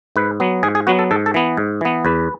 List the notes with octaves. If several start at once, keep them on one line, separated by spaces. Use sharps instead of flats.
G#2 B4
F#3 B3
G#2 G#4
G#4
F#3 B3 F#4
A4
G#2 A4
A4
E3 B3
G#2
E3 B3
E2 B4